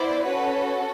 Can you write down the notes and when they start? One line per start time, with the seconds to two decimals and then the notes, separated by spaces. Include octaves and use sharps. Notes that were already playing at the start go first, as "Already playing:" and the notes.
Already playing: B3 E4 C5 D5
0.26 C#4 F#4 A4 B4 C#5